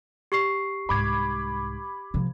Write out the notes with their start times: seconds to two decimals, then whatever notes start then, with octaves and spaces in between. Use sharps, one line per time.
0.32 G4 C#6 C7
0.89 C2 G#2 B5 D6 G#6
2.14 C3 F3